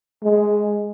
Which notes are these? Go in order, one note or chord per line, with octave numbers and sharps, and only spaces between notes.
G#3